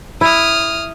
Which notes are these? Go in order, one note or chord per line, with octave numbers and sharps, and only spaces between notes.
E4 D#6 F6